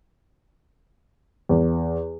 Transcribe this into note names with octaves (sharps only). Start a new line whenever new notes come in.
E2